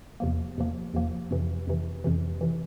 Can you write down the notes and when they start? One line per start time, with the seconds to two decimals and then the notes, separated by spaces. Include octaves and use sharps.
0.20 E2 C3 F3 A#3
0.57 E2 C3 F3 A#3
0.94 E2 C3 F3 A#3
1.31 F2 C3 E3
1.67 F2 C3 E3
2.04 F2 C3 E3
2.41 C3 E3